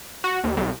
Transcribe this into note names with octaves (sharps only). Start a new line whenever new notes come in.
F#4
D#2
C2